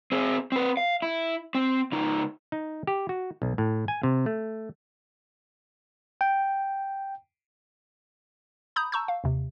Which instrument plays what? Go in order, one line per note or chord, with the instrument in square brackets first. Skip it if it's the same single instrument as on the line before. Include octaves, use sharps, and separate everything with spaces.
[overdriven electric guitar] C4 G#4
C4 B4
F5
E4
C4
C#2 D#4
[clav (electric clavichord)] D#4
G4
F#4
B1
A2
G#5
C3
A3
[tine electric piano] G5
[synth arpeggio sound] A#5 B5 D#6 G6
A5 A#5 C#6 E6 G6
F5
D#2 C3